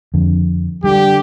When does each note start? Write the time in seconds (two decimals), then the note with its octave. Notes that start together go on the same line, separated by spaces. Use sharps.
0.14 F2 D3
0.84 D3 G3 G4